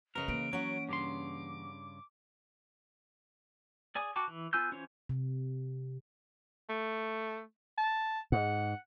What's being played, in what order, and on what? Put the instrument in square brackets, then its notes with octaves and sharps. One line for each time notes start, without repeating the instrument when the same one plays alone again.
[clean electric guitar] C#3 A#4 [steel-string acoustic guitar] B4 D#5
[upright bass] E3 A#3 [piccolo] D7
[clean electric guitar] F#3 [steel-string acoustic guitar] C#4 F#5
[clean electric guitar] G2 C#3 C6 [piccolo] D6
[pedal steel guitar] G#4 D5 G#5 D#6
F#4 G5 A5 D6
E3
B3 F4 G#5 E6 G6
E3 C#4 F4 C5 C#5
[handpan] C3
[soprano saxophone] A3
A5
[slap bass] G#2 [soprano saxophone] F#5